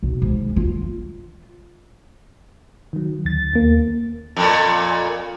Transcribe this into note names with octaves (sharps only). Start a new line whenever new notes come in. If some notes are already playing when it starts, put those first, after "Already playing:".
B1
G#2
F4
D#3 F#3
D2 A6
D#2 A#3
F2 A#2